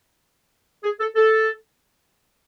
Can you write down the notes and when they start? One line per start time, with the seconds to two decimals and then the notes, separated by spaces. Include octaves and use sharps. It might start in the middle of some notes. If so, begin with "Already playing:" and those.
0.83 G#4
1.00 A4
1.16 A4